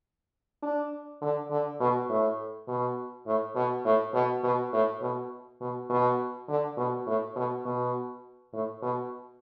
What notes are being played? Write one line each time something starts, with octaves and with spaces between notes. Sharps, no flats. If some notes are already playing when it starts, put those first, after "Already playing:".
D4
D3
D3
B2
A2
B2
A2
B2
A2
B2
B2
A2
B2
B2
B2
D3
B2
A2
B2
B2
A2
B2